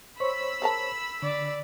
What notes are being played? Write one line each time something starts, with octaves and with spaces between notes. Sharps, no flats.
C5 C#5 B5 C#6 E6
G#4 A#4 A5
D3 D5